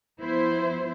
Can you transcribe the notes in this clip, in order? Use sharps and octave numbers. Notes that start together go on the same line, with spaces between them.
F3 B3 E4 C5